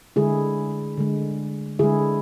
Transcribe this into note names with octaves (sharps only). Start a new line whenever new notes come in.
D3 G#3 E4 G#4
D3 G#3
D3 G#3 E4 G#4